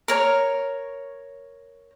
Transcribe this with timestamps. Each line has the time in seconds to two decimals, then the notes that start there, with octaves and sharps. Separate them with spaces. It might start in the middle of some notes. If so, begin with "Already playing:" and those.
0.08 A#4 C#5